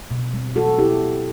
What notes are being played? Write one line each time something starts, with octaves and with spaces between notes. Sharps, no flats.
B2
G3 C4
E3 F#4 A4
B3 E4 G4